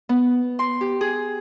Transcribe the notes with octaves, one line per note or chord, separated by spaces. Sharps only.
B3
C6
G4
G#4